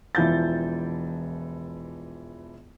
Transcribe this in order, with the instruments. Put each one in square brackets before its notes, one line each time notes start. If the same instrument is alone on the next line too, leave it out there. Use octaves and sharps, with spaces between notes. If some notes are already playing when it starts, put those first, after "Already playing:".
[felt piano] E1 E3 F3 G6 A6